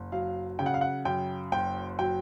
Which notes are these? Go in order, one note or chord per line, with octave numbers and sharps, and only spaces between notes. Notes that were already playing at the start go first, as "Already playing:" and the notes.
Already playing: F#1
F#3 F5
C#3 G5
F#5
F5
F#5
F#2 G5
F#1 G5
F#3 G5